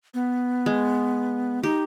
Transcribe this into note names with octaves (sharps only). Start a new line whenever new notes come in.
B3
G#3
D#4 G4